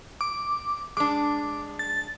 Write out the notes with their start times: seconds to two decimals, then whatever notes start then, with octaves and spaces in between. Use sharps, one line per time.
0.21 D6
0.97 G#3 D4 D6
1.79 A6